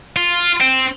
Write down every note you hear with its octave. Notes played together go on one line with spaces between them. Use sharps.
F4
C4